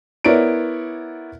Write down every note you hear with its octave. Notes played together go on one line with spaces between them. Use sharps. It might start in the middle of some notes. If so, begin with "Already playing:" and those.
B3 E4 A#4 C#5 D5 D7